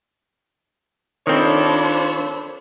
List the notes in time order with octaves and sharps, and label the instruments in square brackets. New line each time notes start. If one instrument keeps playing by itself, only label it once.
[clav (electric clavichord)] D#3 C4 [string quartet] D4 C5 B5 [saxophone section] F4 A4 C#5